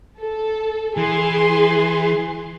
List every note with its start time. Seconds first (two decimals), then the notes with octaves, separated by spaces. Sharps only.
0.20 A4
0.97 E3 G#4 C6